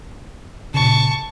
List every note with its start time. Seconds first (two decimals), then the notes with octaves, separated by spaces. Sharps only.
0.74 A#2 C#3 A5 C#6